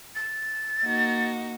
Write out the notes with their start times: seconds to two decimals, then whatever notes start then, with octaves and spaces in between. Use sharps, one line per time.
0.15 A6
0.84 A#3 D#4 F#4